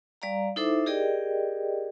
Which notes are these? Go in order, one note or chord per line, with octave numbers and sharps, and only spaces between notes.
G3 D5 F5 A#5
D#4 E4 A4 C5 E5 D6
G4 G#4 A#4 D5 D#5 G5